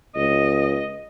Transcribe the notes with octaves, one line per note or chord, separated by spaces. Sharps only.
C#2 D#5